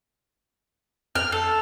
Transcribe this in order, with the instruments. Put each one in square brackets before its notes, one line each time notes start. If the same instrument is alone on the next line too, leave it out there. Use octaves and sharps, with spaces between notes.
[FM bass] F2 [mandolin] F6
[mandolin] A4